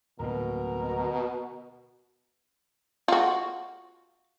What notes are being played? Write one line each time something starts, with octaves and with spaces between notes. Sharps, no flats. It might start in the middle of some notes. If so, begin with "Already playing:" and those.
D1 B2 A#3 A#4
F4 F#4